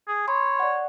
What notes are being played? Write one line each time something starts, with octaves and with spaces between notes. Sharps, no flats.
G#4
C#5 B5 C6
D5 F#5